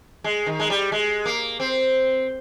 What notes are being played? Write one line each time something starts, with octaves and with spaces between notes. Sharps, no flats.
G#3
D#3
G#3
G3
G#3
A#3
C4